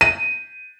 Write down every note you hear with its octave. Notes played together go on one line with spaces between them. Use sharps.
D#7